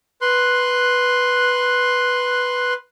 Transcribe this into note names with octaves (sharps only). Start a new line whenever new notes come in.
B4 C6 F#6